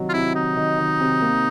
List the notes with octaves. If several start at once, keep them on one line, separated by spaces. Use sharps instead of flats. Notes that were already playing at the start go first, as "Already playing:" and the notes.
Already playing: C3 D#3 F#3
F4
C3 E4
D#3 D#4
D#3
D#3
C3
A#3